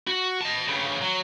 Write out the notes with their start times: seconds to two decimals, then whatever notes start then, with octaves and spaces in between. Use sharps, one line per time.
0.08 F#4
0.41 D#5 A5
0.68 G2 C#3
1.01 F#3